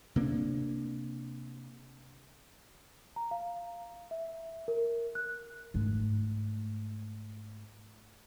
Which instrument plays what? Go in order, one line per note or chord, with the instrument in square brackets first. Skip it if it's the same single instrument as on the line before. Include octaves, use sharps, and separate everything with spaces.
[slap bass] C3 A#3 C#4 D4
[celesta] A#5
F5
E5
A#4
F#6
[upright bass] G#2 A3